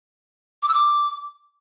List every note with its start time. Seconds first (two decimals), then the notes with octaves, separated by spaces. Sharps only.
0.63 D6
0.68 E6
0.74 D6